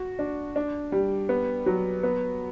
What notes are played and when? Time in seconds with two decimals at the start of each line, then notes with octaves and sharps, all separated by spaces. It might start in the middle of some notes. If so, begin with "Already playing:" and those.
Already playing: F#4
0.19 D4
0.56 D4
0.92 G3
1.29 B3
1.66 F#3
2.03 B3